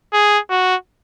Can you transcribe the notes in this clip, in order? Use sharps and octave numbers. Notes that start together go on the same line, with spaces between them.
G#4
F#4